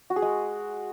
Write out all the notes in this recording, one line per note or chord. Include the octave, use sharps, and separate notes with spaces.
F#4
G#4
G#3